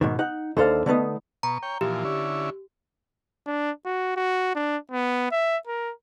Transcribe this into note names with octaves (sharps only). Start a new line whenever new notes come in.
G#2 B2 D#3
D#4 F#5
D#2 D3 A4 C5 F5
D3 A3 B3 D#4
B2 A#5 C#6
C#5 G5
A#2 E3 F3 G4
D3 C#4 E4
D4
F#4
F#4
D4
B3
E5
A#4